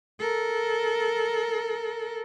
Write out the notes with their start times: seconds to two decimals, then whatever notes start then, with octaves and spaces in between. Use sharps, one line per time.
0.19 A4 A#4